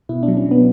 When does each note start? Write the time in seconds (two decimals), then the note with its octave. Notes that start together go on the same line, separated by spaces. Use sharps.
0.09 B2 E4
0.23 D4
0.28 F#3
0.37 C#4
0.46 F#3
0.51 B3